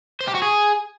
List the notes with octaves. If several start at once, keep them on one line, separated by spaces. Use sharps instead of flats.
C5
G4
F#4
G#4